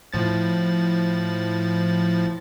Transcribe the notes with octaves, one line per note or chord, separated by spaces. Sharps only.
A2 F3 A6